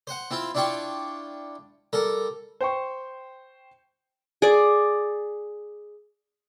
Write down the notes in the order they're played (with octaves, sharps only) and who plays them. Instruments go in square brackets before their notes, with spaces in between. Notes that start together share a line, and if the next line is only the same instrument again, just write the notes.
[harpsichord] C5 F#5
C4 E4 F4
D4 E4 F4 G5 C#6 D6
G3 A4 A#4
[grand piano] C5 G5 C#6
[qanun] G#4 D5